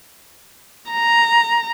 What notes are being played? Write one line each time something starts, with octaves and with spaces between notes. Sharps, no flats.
A#5